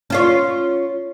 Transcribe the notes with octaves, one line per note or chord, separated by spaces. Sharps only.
C#4 F4 C#5